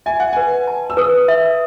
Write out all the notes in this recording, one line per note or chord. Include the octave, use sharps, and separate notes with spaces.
E5 G#5
F#5
B4 G#5
A5
E6
B4 D#6
E5